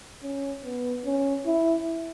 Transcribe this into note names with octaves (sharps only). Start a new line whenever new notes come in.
C#4
B3
C#4
E4